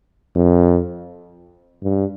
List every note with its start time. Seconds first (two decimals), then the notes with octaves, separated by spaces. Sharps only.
0.36 F2
1.83 G2